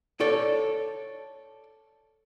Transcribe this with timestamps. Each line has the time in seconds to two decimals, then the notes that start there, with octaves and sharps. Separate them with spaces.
0.20 A4 C#5 D5